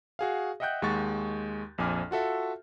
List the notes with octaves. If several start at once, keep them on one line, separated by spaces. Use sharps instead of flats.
F#4 G#4 F5
D#5 E5 F#5 G5 F#6 G6
D#2 G#3 F#5 C#6 A6
A#1 F2 G#5 D6 F6
F4 F#4 A4 E5